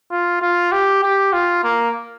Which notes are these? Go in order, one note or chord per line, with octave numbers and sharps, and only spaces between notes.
F4
F4
G4
G4
F4
A#3